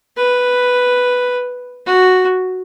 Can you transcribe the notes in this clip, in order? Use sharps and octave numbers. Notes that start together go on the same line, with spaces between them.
B4
F#4